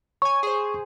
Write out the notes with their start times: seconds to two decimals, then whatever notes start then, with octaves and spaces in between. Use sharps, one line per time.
0.22 C#5 G#5 C#6
0.43 G#4 C5